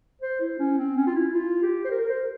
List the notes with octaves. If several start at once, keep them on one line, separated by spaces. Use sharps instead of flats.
C5
E4
C#4
C4
C#4
F4
E4
F4
G4
C5
A#4
A#4
C5